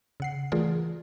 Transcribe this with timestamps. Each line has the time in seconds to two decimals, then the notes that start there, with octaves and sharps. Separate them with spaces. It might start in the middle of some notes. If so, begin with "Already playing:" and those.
0.20 C#3 F#5 C7
0.52 E3 A3 F4 G#4 A#4 D5